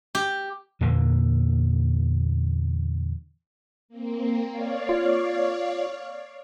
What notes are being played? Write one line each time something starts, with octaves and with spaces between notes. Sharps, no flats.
G4
E2 A#2 D3 A#3
A#3 C4
C#5 D5 F5
F4